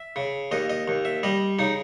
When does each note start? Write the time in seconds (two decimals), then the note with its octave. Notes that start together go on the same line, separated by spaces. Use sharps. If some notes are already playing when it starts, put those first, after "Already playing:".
Already playing: E5
0.16 C#3
0.51 D#2 D#5
0.70 D#5
0.88 D#2
1.05 E5
1.23 G3 D#5
1.59 C#3 D#4